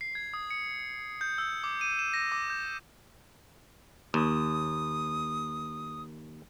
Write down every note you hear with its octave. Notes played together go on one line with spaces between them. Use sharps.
C7
G#6
D#6
C#7
G6
E6
D6
D#7
E7
A#6
D6
G6
D#2 D#6